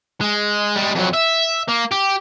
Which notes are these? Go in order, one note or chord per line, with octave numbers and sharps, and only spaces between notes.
G#3
G3 G#3
F2 F#3
E5
A#3
G4